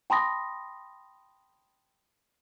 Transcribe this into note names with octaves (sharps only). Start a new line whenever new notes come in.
G5 A5 B5 C6 D#6 A#6